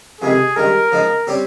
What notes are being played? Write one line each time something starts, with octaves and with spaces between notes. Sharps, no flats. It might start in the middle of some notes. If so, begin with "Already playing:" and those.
F2 C3 D#3 G#3 G#4
G2 D#3 G#3 A#4
F3 G#3 D#4
G3 C4 G4 C#5